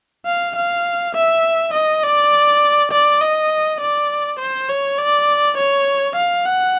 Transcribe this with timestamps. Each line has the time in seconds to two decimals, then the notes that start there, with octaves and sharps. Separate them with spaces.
0.26 F5
0.55 F5
1.15 E5
1.74 D#5
2.04 D5
2.92 D5
3.21 D#5
3.80 D5
4.39 C5
4.69 C#5
4.99 D5
5.57 C#5
6.16 F5
6.45 F#5